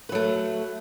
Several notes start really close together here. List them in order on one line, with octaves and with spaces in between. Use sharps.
B4 F#3 A3